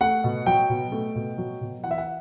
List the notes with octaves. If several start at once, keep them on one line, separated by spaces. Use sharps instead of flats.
A3 F#5
B2
F#3 G5
B2
A3
B2
F#3
B2
E3 F#5
E5
F#5